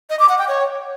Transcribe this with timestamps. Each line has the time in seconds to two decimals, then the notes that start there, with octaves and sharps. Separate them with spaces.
0.10 D#5
0.19 D6
0.29 F#5
0.39 G5
0.48 C#5